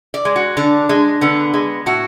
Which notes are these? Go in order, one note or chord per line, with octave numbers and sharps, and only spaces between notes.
D5
G#3
F#4
D3 D4
G#3 D4
D3 B3
G#3
A2 F#4